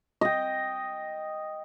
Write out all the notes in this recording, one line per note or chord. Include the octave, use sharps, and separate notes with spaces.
D#5 G5